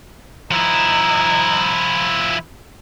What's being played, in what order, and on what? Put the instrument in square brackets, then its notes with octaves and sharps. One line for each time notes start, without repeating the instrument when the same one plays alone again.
[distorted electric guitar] F3 E4 [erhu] D#4